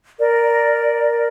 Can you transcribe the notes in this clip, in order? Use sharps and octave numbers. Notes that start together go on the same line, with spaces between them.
A#4 D5